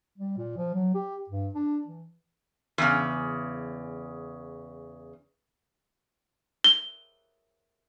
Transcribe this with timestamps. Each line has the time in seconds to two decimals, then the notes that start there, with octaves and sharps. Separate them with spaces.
0.18 G3
0.37 A#2
0.57 F3
0.74 F#3
0.94 G4
1.29 G2
1.54 D4
1.87 E3
2.78 E2 C#3
6.64 G7